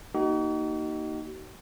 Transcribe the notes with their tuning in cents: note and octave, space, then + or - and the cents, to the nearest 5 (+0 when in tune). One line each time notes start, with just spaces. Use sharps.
A#3 +0 D#4 +0 F#4 +45